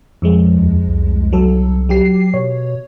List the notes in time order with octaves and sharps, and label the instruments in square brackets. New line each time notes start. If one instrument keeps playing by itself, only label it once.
[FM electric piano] F2 F3 G#3
[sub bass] D#2
C2
[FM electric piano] F#3 A4
F#3 G4 C7
[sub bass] B2 [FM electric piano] C#5